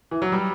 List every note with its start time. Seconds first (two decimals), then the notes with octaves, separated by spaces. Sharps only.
0.11 E3
0.22 F#3
0.32 G3